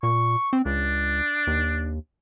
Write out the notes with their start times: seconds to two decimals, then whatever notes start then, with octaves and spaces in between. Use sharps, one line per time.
0.03 A#2 C#6
0.53 C4
0.65 C#2 D4
1.47 D#2